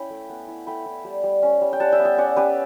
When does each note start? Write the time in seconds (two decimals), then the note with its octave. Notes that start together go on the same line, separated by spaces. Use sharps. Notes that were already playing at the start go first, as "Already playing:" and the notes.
Already playing: C#4 E4 G5 B5
0.10 A3
0.29 B3
0.48 E4
0.67 A3 G5 B5
0.86 E4
1.05 G3
1.23 G3
1.43 C#4
1.61 G3
1.73 G5
1.80 G3 F#5 A5
1.92 E5 G5
1.99 B3
2.05 E5 G5
2.17 C#4 D5 F#5
2.36 C#4 G4 B4